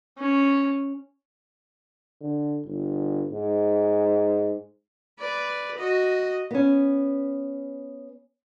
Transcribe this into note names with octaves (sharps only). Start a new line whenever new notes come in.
C#4
D3
G1
G#2
B4 D5
F#4 D#5
B3 C#4